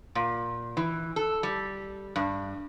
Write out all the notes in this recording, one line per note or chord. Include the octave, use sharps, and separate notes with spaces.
A#2
E3
A4
G3
G2